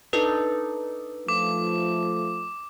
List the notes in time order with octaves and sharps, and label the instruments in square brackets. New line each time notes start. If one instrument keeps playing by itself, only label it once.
[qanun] D4 D#4 A4 [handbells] B4
[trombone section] F3 A3 [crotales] D6